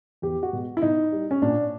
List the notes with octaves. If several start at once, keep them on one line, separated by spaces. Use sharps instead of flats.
E2 G4
F#4
B2 G#3
E4
B2 D#4
G3
C#4
A#2 D4